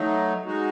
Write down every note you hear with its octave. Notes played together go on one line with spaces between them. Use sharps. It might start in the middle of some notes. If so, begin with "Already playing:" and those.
Already playing: F#3 A3 D#4
G#3 D#4 F#4